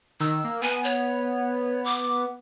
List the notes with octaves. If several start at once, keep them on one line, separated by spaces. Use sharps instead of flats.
D#3 E6
A#3
B3 G#5
C#5
D6